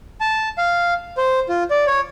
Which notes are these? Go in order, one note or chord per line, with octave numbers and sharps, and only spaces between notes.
A5
F5
C5
F4
D5
C#5